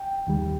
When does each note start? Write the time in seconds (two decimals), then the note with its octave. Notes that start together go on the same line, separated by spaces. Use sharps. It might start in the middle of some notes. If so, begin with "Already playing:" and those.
Already playing: G5
0.27 D#2 D#3 G3